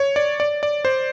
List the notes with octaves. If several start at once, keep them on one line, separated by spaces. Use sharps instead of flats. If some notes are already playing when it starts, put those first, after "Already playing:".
Already playing: C#5
D5
D5
D5
C5